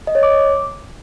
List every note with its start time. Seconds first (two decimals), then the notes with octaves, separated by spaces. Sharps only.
0.07 D#5
0.15 C#5
0.23 D6